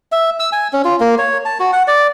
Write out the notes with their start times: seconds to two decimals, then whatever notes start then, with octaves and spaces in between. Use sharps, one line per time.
0.12 E5
0.40 E6
0.52 G#5
0.73 C#4
0.85 F4
1.00 A#3
1.18 C#5
1.45 A5
1.60 F#4
1.73 F#5
1.88 D5